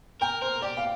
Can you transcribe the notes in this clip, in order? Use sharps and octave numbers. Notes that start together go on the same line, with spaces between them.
A#4 G5
A#4 C5
G4 D5
F5